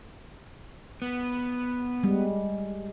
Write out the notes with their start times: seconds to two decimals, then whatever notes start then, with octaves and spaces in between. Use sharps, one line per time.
1.02 B3
2.04 G3 G#3